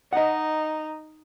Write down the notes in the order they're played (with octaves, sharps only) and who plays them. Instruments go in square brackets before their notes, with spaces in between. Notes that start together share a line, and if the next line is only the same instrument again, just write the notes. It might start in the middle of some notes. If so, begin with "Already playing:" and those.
[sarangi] D#4 [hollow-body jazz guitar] D#5 F#5